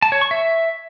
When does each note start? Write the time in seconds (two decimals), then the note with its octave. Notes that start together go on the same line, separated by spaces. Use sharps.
0.02 A5
0.12 C#5
0.21 C#6
0.31 E5